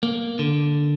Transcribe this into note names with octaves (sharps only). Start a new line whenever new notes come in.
A#3
D3